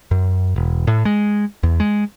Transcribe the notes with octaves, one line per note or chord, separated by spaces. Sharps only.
F#2
E1
A2
G#3
E2
G#3